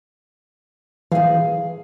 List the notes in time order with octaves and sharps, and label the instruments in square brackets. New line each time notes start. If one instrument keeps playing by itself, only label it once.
[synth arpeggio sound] E3 [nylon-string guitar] G#4 F5